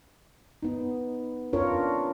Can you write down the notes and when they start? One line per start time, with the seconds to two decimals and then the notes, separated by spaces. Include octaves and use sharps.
0.63 B3 D#4
1.53 C#4 D4 F4 A#4 C#5